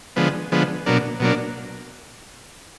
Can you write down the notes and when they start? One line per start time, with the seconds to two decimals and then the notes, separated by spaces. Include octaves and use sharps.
0.16 D3 F3 G#3 B3
0.52 D3 F3 G#3 B3
0.86 B2 F#3 A#3 D4
1.20 B2 F#3 A#3 D4